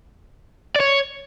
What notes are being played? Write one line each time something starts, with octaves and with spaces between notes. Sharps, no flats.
D5
C#5